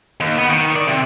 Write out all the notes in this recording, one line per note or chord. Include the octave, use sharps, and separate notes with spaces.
D#2
B3
D#3
D5
C3